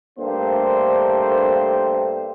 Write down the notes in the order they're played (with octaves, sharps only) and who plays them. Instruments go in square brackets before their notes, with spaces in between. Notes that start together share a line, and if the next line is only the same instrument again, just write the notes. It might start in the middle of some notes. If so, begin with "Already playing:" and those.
[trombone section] G2 A3 A#3 D4 G4 C5